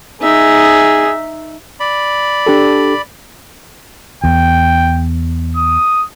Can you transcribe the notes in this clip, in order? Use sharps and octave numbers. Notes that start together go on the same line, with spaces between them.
D#4 G#4 E5
D5 B5
D4 G4 A4
E2 G5
D#6